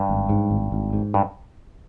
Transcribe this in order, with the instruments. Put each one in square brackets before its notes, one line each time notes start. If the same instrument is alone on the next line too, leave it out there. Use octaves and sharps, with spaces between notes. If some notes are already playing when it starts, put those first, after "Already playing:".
Already playing: [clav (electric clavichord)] G2
[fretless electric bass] G#1
G#2
G#1
G#1
G#2
[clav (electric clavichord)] G2